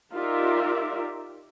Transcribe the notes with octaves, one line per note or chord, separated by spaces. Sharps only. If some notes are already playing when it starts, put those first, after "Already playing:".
D#4 F4 G4 A#4 D5 E5